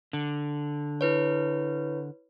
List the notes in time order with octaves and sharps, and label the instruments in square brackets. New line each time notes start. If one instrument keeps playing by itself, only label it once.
[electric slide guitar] D3
[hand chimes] E4 B4 C#5